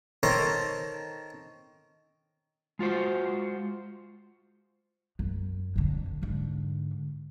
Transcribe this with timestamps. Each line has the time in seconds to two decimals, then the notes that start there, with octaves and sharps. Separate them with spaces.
0.23 D#3 A4 A#4 C5 C#5
2.79 G#3 F4 F#4 C5
5.19 F#2
5.76 F2 D3
6.22 G#2 D3